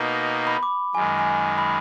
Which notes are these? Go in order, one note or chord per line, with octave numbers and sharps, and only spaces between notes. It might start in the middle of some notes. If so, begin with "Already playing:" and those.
Already playing: B2 A#3 D#4
B5
D6
F#2 D#3 G#3 G#5
G#5
B5